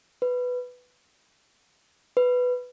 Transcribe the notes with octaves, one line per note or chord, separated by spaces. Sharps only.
B4
B4